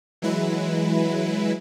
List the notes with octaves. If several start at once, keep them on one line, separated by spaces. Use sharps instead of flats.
E3 F#3 G#3 E4 B4